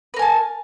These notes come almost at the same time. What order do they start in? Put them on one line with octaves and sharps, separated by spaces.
B4 A#4 G#5 A5